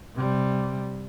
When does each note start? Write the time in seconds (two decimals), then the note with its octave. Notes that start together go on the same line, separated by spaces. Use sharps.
0.16 C3 G3